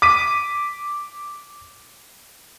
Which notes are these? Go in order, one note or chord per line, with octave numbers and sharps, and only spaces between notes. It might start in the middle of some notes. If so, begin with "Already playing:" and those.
D6 B6 D#7